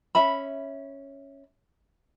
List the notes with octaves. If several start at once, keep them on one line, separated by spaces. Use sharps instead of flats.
C#4 E5 B5